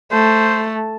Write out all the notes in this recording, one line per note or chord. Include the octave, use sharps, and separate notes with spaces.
A3 C5